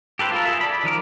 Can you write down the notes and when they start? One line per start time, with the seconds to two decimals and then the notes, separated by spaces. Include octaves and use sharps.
0.19 G4 A4 B4 C5
0.32 F4 A4 A#4
0.45 G#4 A4 E5
0.61 D5 B5
0.84 D#3 F3 A#4 D6